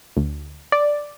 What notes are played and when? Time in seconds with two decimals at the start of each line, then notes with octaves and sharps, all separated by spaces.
0.17 D2
0.72 D5